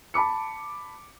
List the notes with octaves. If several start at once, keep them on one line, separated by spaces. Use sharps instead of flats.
A5 B5 D6 C#7